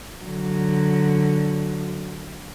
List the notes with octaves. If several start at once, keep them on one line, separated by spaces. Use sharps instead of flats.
D3 F#3